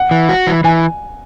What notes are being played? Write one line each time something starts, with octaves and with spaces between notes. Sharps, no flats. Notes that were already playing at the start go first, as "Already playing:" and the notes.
Already playing: F#5
E3
F#4
E3
E3 G#5